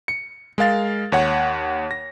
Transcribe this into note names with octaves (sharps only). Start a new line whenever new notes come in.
C#7
G#3 A#4 F5 A6
D#2 C#5 F#5
A#6